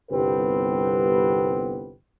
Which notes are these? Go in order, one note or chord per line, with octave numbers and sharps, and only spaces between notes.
G1 C2 B3 C4 G4 B4